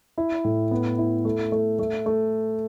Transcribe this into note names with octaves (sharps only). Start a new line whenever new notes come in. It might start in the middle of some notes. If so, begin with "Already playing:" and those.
E4
A2
B3
E4
A3
A3
A3
A3